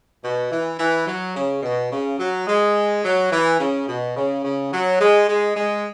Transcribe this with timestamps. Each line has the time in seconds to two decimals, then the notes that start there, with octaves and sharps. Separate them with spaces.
0.23 B2
0.51 E3
0.79 E3
1.07 F#3
1.35 C#3
1.63 B2
1.91 C#3
2.19 F#3
2.47 G#3
3.04 F#3
3.32 E3
3.59 C#3
3.87 B2
4.16 C#3
4.44 C#3
4.72 F#3
5.00 G#3
5.28 G#3
5.56 G#3